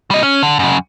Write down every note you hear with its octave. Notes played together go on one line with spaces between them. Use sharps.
G3 D#5
C#4
D3
F#2 C#3